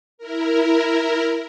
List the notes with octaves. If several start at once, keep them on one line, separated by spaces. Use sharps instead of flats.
E4 A#4